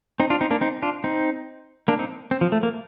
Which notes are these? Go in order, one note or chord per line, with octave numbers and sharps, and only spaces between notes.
C4 D#4
D4 F4
C4 D#4
A#3 D4
C4 D#4
D4 F4
C4 D#4
A#3 D4
C4 D#4
C4
F3
A3
A#3